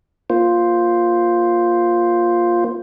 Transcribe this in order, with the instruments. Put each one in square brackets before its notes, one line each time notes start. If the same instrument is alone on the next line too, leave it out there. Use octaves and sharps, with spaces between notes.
[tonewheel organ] A#3 F4 C5